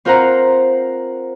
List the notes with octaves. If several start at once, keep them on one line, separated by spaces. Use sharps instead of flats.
C4 F4 A#4 C5 F#5 A#5